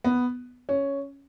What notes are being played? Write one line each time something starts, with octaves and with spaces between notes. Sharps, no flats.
B3
C#4